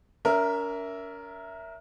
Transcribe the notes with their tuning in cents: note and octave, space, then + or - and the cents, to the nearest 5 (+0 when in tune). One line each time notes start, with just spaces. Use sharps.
C#4 +45 A#4 +0 E5 +0